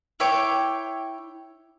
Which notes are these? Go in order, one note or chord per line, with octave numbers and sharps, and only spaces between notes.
E4 C#5 G5 D6